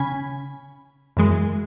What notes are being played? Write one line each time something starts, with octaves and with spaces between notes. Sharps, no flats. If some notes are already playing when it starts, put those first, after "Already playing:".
Already playing: C#3 C#4 G#5 B5
F#2 E3 G#3